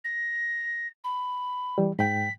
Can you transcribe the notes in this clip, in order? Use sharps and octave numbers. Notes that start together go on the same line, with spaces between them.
A#6
B5
E3 G3
G#2 G5 B6